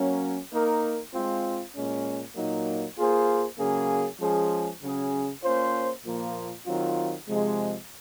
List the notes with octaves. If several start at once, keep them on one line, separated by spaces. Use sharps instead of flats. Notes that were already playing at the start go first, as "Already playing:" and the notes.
Already playing: F#3 A#3 C#4
A#3 D#4 A#4
G#3 C4 F4
A#2 G#3 C#4
A#2 F#3 A#3 D#4
A#3 F4 G#4 C5
C#3 F#3 A#3 C#4 G#4
F3 G#3 C#4 G#4
C#3 F#3 C#4 G#4
A#3 C#4 F4 C5
A#2 F3 A#3 F4 A#4
D#3 F#3 C4 F4
C3 F3 G#3